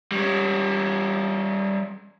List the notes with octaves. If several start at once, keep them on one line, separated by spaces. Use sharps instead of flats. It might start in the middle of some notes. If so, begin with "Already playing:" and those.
G3 C#4